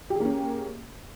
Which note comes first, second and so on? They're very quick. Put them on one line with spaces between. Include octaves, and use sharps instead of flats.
G4 G#4 A#3 C#4